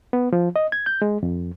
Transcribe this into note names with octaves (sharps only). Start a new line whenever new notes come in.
B3
F3
D#5
G#6
G6
G#3
F2